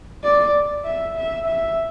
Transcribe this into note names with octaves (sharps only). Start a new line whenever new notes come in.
D5
E5
E5
E5